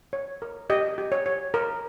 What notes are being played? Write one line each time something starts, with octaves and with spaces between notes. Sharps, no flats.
C#5
A#4
G4 D#5
G4
C#5
C#5
A#4